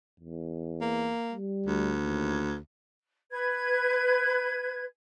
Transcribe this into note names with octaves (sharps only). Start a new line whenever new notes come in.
E2
A#3
G3
D2
D#2
B4 G#6